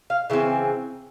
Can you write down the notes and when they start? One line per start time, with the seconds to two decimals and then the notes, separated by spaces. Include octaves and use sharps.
0.10 F5
0.30 C#3 E3 C4